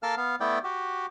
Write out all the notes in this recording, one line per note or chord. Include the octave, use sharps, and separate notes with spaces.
A#3 A4 A#4 F5 A5 F6
B3 F5
A3 B3 E4 D5 G5
F#4 G4